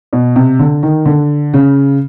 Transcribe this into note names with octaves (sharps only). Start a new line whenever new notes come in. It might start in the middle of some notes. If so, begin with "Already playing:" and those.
B2
C3
D3
D#3
D3
C#3